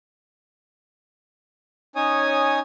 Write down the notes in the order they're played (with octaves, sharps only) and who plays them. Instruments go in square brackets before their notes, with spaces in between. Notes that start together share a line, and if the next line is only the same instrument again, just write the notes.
[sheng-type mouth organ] C#4 D#4 C#5 G#5 D#6